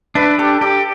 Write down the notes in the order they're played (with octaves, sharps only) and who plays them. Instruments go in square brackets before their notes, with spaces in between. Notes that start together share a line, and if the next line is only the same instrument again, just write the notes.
[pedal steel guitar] D4 [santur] B4 E5
[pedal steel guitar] G4 [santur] A4 D5
[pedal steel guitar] G4 [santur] A4 D5